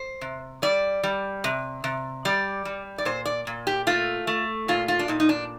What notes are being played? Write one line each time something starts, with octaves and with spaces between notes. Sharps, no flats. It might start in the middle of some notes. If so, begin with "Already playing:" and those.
Already playing: C5
C3
G3 D5
G3
C3
C3
G3 D5
G3
D5
A#2 C5
D5
A#2
G4
A3 F4
A3
A#2 F4
F4
D4
A#2 D#4
D#4
D4